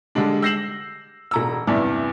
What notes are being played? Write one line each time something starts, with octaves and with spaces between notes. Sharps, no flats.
D3 G3 G#3 D4
E6 G6 A#6 C7 E7 F#7
E1 A#5 E6
E2 G2 C3 E4 D5